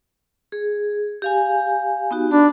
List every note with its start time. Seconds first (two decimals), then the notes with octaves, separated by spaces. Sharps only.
0.52 G#4
1.22 G4 F5 G#5
2.11 B3 D#4 F#4
2.31 D4 A5 B5